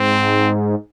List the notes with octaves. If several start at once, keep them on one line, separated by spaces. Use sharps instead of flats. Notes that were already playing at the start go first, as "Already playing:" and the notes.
Already playing: G#2 C4